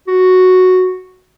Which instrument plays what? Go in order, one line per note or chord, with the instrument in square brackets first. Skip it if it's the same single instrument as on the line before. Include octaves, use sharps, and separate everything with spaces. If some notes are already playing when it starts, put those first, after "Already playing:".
[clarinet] F#4